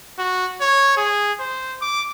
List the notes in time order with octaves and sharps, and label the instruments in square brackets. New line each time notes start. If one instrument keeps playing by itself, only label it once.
[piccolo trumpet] F#4
C#5
G#4
C5
D6